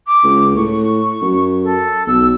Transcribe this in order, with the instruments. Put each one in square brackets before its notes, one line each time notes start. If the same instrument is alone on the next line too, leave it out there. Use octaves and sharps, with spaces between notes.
[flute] D6
[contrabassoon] C#2
[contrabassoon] A2 [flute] C#6
[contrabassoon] F#2
[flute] A4
[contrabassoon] B1 [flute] E6